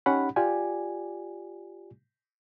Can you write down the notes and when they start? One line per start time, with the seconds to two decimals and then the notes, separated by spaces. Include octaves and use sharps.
0.06 C#4 D#4 G4 F#5 B5
0.36 F4 G4 D5 G#5